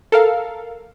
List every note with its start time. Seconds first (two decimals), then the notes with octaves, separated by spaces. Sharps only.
0.12 A4 A#4 F5